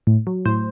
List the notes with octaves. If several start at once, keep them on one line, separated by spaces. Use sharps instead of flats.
A2
F#3
A2 C5